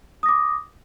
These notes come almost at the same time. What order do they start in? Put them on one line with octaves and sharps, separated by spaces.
D#6 A#6 D6